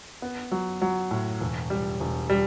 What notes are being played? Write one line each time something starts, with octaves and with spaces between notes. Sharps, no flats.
B3
F#3
F#3
A2
E1
G3
E1
G3